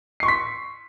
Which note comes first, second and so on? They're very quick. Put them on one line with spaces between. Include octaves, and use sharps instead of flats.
C7 C#6 C6 B6